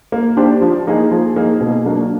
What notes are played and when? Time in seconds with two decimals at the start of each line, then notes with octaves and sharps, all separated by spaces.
0.12 A#3
0.37 D4 G4 C5
0.62 F3
0.87 A#3 D#4 G#4
1.11 F3
1.36 A#3 D#4 G#4
1.61 B2
1.86 F#3 A#3 D4 F#4